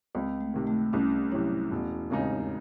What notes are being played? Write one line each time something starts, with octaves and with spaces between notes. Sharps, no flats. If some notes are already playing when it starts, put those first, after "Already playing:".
C#2 C4
A3
C3 D#3
A3
C2 C#4
C3 F#3 E4
E1
D#2 C#3 G#3 C4 D#4